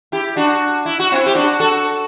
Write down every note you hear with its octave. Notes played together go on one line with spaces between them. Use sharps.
E4 G4
D4 F#4
E4
F#4
C4 E4
G4
D4 F#4
F#4 A4